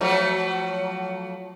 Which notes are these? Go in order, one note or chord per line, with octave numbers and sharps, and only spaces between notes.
F3 F#3 A3